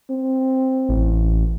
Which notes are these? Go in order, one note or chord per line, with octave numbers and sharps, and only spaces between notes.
C4
A1